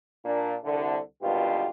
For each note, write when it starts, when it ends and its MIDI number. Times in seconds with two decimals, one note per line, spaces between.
0.25 0.56 46
0.25 0.56 62
0.64 0.99 36
0.64 0.99 50
1.22 1.68 32
1.22 1.68 43
1.22 1.68 47
1.22 1.68 50
1.22 1.68 65
1.22 1.68 67